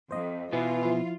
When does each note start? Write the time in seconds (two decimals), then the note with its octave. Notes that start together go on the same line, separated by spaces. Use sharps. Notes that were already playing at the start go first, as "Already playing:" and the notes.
0.11 F2 C5 D#5
0.52 B2 E3 B3 F4
0.83 F3 E4